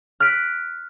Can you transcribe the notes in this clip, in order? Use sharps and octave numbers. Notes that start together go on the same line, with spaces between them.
F6 F#6 B6 D7